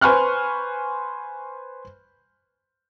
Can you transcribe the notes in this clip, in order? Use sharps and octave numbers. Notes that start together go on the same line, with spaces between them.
B4 C5 G#5 C#6 F6 F#6